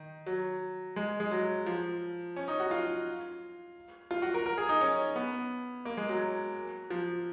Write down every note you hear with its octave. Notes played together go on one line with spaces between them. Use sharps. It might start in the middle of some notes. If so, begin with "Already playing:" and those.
Already playing: D#3
F#3
G#3
G#3
F#3
F3
C#4
D#4
F#4
F4
F4
F#4
A#4
A#4
G#4
D#4
C#4
B3
A#3
G#3
F#3
F3